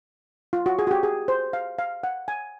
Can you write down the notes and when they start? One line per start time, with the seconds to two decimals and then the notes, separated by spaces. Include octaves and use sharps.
0.53 F4
0.66 F#4
0.79 G#4
0.87 F#4
0.91 G4
1.03 G#4
1.28 C5
1.53 F5
1.79 F5
2.04 F#5
2.28 G#5